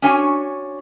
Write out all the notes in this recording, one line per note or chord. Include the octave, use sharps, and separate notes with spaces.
C#4 D4 F#4 C#5 G#5